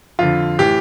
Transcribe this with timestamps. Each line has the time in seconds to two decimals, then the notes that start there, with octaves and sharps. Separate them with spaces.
0.19 F2 D3 F4
0.59 A2 E3 G4